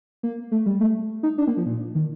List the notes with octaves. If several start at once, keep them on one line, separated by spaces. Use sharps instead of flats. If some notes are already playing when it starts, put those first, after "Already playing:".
A#3
A3
G3
A3
D#4
D4
A#3
F3
A#2
D#3